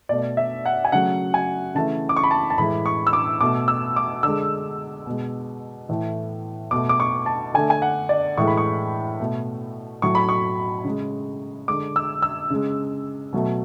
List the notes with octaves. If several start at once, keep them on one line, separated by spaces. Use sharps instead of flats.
B2 A3 D5
E5
F#5
G#5
C#3 F#3 A3 F#5
G#5
C#3 E3 A3 A5
D6
C#6
B5
A5
A5
A2 E3 G#3 B5
C#6
E6
D6
B2 A3 D6
E6
D6
D3 G#3 E6
B2 G#3
A2 E3 A3
B2 A3 D6
D6
C#6
A5
D3 A3 G#5
G#5
F#5
D5
A2 E3 G#3 C#6
B5
C#6
B2 A3
A2 F#3 A3 C#6
B5
C#6
C#3 G#3
D3 G#3 D6
E6
E6
C#3 G#3
B2 F#3 A3